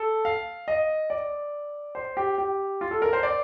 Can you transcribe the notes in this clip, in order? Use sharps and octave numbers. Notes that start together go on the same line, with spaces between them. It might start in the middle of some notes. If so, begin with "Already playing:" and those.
Already playing: A4
F5
D#5
D5
C5
G4
G4
F4
A4
A#4
C5
D5